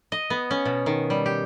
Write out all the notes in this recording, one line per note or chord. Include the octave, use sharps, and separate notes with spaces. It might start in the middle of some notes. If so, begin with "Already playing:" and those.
D#5
B3
C#4
B2
D#3
G3
G4